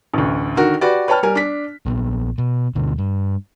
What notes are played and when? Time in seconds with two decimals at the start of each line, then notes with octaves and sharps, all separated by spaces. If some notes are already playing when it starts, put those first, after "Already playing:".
0.14 A1 D2
0.57 D3 D#3 F#4 A#4
0.81 F#4 G4 B4 D5
1.08 B4 C#5 G5 A5 F6
1.23 G3 A#4 G#5
1.35 D4 B6
1.86 A#1 B3
2.38 B2
2.75 D2 B2 D3
2.98 G2